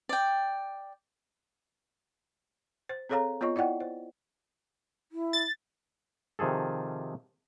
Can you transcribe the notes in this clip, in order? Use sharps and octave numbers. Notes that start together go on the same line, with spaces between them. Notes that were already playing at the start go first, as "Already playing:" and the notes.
D5 G5
C5
C4 G#4 A4 C#5 F5 A#5
B3 F4 C#5 D#5 C#6
E4 D5 D#5 F#5 G5
C5
E4
A6
C3 D#3 F3 G#4 A4